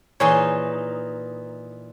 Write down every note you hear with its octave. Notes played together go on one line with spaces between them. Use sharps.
A#2 E3 D#4 G#4 C#5